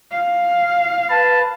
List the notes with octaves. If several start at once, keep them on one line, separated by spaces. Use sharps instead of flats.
F5
B4 A5